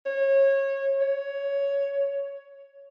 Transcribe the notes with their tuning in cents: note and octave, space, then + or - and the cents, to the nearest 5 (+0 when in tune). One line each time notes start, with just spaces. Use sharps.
C#5 -25
C#5 +10